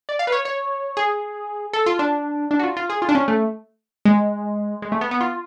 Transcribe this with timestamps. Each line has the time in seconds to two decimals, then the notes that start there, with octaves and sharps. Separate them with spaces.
0.09 D5
0.19 F5
0.27 B4
0.32 C#5
0.45 C#5
0.97 G#4
1.73 A4
1.86 F4
1.99 D4
2.51 D4
2.59 F#4
2.63 F4
2.77 F4
2.90 G#4
3.02 F4
3.09 D4
3.15 C#4
3.28 A3
4.05 G#3
4.82 G#3
4.92 A3
5.01 B3
5.11 B3
5.21 F4